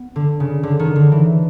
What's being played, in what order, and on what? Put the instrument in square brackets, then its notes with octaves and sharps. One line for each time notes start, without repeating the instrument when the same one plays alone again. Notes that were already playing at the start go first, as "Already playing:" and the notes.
Already playing: [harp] B3
D3
C#3
D3
D#3
D3
E3